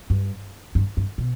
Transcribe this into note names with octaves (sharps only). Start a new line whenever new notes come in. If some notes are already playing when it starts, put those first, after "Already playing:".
G2
G2
G2
B2